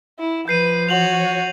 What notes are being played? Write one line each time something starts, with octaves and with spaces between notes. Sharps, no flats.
E4
F3 B4 G6 C7 D#7
F#4 C#5 F7 F#7